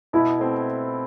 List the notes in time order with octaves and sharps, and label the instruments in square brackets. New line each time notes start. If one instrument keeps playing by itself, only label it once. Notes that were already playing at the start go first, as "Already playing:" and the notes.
[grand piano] B2 [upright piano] E4
[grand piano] A3 C4